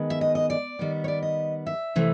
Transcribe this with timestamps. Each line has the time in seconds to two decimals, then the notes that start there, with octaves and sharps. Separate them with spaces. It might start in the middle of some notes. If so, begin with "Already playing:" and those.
Already playing: D#3 G#3 B3
0.10 E5
0.21 D#5
0.35 D#5
0.50 D5
0.79 D#3 G3 B3
1.04 C#5
1.08 D5
1.22 D#5
1.67 E5
1.96 C3 E3 A3